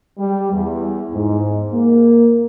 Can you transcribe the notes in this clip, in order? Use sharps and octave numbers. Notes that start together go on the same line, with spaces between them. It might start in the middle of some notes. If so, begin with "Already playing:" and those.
G3
E2
G#2
A#3